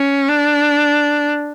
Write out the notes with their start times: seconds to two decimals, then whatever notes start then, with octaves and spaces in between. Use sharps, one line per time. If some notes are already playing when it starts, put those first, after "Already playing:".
Already playing: C#4
0.29 D4